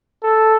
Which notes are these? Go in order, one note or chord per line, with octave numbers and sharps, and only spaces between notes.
A4